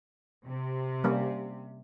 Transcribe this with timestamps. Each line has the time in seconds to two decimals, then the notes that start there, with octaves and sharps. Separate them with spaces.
0.45 C3
1.04 G3 A#3 C#4